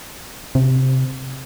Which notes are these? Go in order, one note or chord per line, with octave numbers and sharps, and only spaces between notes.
C3